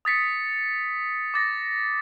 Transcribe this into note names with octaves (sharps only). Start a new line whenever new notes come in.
D#6 A6 B6 C#7
D6 A6 A#6